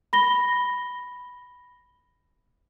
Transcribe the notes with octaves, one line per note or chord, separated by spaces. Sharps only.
B5 A#6 G7